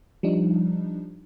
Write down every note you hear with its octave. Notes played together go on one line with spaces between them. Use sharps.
F3 G3 D4 D#4